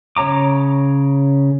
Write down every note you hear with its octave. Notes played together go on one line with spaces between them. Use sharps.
C#3 C#5 A#5 D6